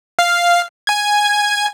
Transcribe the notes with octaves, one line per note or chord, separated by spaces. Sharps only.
F5
G#5 G#6